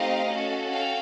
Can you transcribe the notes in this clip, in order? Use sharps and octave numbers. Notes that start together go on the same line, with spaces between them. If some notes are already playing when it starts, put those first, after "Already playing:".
Already playing: A3 C4 D#4 G4 D#5 F5
C#4 F#4 A4
F5 G5